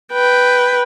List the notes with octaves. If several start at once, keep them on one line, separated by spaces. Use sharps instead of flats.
B4 G5